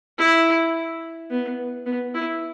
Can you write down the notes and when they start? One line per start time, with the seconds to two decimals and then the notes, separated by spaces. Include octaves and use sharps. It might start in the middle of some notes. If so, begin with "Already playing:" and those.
0.18 E4
1.31 B3
1.86 B3
2.14 E4